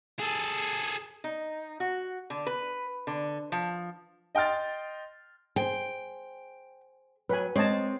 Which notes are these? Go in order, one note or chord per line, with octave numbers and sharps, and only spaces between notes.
G#4 A4
D#4
F#4
D3
B4
D3
F3
D#5 G5 C6 F6 A6
G#4 C5 G5
F#3 B4 G#5
G#3 C4 C#5 D#5 A5